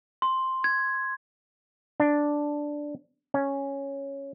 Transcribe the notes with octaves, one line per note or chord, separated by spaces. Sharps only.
C6
G#6
D4
C#4